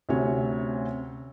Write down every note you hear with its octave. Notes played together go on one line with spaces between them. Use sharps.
D2 C3 C#4 C#5